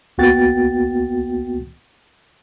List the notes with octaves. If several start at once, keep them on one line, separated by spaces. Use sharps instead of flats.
C#2 A#3 B3 F#4 G5 A6